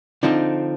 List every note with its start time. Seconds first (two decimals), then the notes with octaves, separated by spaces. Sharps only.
0.23 D3 F3 C4 D#4